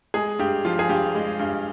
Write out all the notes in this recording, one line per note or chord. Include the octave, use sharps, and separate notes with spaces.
G#3 G#4
G2 G4
F3 F4
G#4
G2 G4
G#3
G2